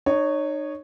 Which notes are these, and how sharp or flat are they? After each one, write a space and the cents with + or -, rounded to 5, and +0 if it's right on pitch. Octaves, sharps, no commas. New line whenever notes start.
D#4 -35 C#5 +0